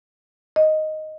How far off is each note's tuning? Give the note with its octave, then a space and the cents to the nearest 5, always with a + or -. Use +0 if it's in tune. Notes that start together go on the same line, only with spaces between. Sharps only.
D#5 +0